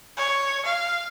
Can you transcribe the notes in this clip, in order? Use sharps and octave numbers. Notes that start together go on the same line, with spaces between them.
C#5
F5